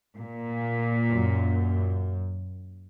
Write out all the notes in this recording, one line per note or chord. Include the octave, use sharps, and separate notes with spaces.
A#2
F#2